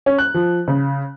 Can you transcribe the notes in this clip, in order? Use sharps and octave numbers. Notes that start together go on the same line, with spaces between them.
C#4
F#6
F3
C#3